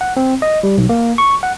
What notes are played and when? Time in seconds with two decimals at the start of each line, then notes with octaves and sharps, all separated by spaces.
0.01 F#5
0.17 C4
0.42 D#5
0.63 G3
0.78 B1
0.89 A#3
1.18 C#6
1.43 F#5